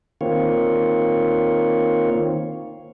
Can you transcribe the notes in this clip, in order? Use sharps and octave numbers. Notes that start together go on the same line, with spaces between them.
D#3 A#3 C4 F4 C#5